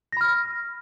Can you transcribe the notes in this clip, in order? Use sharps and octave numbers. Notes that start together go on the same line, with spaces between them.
B5 F6 A#6